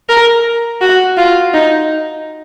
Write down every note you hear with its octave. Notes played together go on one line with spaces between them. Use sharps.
A#4
F#4
F4
D#4